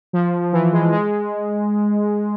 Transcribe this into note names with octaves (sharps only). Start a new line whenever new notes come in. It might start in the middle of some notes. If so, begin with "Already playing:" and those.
F3
E3
G#3
G#3